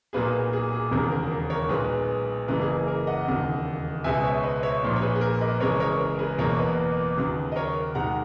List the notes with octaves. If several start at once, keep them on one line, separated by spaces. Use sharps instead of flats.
B1 A#2 F#3 A#3 G#4 B4
G#4
G#4
E1 D#2 C#3 F#3 A#4
A#4
A#4
A#4 C#5
B1 A#2 G#3 G#4 B4
F#1 F#2 C#3 E3 A#3 A#4
G#4
G#4
A#4
D#5 F#5
E1 D#2 C#3
C#2 B2 G#3 E5 G#5
C#5 E5
B4 D#5
C#5 E5
A#1 A#2 A#3
C#5
G#4 B4
G#4
A#4
B4 D#5
F#1 F#2 C#3 E3 G#3 A#4 C#5
A#4 C#5
A#4
A#4
G#4 B4
F#1 E2 B2 A#3 A#4 C#5
B4 D#5
D#2 C#3 F#3
D#5
A#4 C#5
D#2 D#3 G#3 F#5 A#5